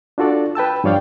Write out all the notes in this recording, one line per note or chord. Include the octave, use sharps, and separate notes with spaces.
D4 F4 F#4 A4 D5
B4 G5 A5 E6
G2 F3 C#5 D5 F5 G5